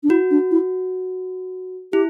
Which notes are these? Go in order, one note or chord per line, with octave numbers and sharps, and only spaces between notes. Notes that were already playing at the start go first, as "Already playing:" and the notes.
D4
E4 F#4
D4
E4
E4 G4